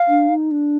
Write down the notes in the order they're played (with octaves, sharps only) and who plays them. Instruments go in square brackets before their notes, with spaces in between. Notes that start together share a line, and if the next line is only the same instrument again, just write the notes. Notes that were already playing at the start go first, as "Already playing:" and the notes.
Already playing: [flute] F5
[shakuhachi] D4
D#4
D4